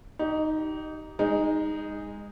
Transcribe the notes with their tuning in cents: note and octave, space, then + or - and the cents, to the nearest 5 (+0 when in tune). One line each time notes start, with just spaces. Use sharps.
D#4 +0 G4 -30
G#3 -25 D#4 +0